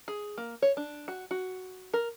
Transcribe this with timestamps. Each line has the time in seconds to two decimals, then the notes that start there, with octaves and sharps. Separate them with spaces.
0.08 G#4
0.38 A#3
0.62 C#5
0.77 D4
1.08 F#4
1.31 F#4
1.94 A#4